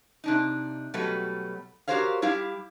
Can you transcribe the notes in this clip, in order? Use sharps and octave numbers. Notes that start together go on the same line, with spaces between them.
C3 D4 D#4
B2 F#3 G3 A3 B4
F#4 G4 A#4 C5 C#5 F5
G3 E4 G4 F5